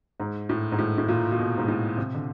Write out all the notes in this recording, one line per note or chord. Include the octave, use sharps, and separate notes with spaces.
G#2
A2
G#2
A2
A2
A#2
A#2
B2
G#2
A2
C3
D3